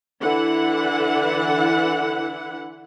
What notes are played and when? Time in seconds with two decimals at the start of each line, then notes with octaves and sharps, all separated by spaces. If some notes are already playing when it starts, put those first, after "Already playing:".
0.22 D3 E3 E4 F#5